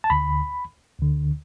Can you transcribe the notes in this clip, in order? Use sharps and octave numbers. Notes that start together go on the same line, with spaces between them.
A5
D2 D3 B5
D2 D3